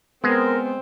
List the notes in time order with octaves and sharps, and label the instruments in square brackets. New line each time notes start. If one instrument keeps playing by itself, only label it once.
[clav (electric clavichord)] G#3 [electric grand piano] B3 [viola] C4 [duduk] A#4